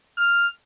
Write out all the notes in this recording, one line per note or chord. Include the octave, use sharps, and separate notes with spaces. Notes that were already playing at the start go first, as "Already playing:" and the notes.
F6